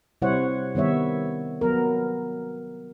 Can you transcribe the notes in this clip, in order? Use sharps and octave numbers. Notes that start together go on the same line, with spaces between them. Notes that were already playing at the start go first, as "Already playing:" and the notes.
C3 G3 E4 C5 C#5 F#5
D#3 G3 B3 C#5 E5
F#3 B3 A#4